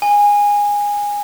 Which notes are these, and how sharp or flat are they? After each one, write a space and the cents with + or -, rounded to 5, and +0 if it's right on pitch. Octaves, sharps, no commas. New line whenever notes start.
G#5 -15